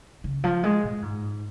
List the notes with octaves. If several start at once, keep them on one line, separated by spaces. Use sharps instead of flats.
C#3
F3
G#3
A#2
G#2